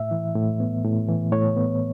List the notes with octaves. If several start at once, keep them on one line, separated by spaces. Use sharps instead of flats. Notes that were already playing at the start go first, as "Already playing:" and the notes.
Already playing: A2 E5
E3
A2
B3
A2
E3
A2 C#5
B3